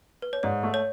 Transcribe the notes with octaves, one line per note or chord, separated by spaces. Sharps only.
B4
C#5
G#2 D5
A3
C#5